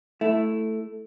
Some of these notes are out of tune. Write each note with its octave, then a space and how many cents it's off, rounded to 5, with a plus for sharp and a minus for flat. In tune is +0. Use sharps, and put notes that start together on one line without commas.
A3 +0 E4 +0